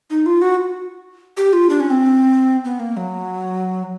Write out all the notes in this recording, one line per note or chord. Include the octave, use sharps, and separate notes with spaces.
D#4
F4
F#4
G4
F4
D4
C#4
C4
B3
A#3
F#3